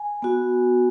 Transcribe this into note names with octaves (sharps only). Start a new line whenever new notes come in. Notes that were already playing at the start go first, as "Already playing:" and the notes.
Already playing: G#5
B3 F#4